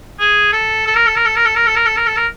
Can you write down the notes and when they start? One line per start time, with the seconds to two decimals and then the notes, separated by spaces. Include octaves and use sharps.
0.20 G#4
0.53 A4
0.86 A4
0.96 A#4
1.06 A4
1.16 A#4
1.26 A4
1.36 A#4
1.46 A4
1.56 A#4
1.66 A4
1.76 A#4
1.86 A4
1.97 A#4
2.07 A4
2.16 A#4